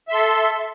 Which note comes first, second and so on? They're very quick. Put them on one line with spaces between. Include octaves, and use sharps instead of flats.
E5 C6 A4